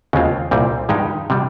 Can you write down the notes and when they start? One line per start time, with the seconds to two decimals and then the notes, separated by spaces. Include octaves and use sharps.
0.13 D#2 C#3 G#3 C4 F4
0.51 C2 A#2 G3 C4
0.89 G2 D#3 G#3 D#4 G4
1.30 C3 G3